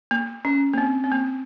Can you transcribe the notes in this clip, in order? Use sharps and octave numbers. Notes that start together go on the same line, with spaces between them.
A#3
C#4
A#3
C4
C4
A#3